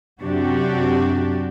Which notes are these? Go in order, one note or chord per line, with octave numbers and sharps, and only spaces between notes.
F#2 C3 F#3 D4 F#4 G4